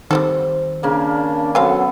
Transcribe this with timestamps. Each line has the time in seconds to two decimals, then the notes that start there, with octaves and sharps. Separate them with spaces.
0.11 D#3 G3 C4 A4 C5
0.83 C#3 A#3 D4
1.55 F#3 B3 C4 A4 F5 G#5